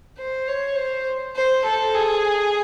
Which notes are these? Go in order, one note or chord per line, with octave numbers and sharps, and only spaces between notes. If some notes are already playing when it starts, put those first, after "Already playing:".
C5
C#5
C5
C5
A4
G#4